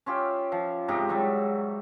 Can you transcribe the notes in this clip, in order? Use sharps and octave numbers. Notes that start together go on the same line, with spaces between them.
C#4 F4 G4 E5
F3
G#2 C3 D#4 G4
G#2 F#3 G3 E5